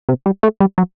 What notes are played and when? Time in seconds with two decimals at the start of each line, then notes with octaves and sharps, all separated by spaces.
0.09 C3
0.26 G3
0.43 A3
0.60 G3
0.78 F#3